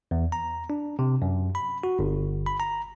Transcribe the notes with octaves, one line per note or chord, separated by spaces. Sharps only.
E2
A#5
D4
C3
F#2
B5
F#4
G1
B5
A#5